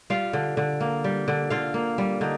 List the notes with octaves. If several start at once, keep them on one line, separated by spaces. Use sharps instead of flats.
G3 F4 F5
D3
D3
A#3
G3
D3
D3 F4 F5
A#3
G3
D3 D#4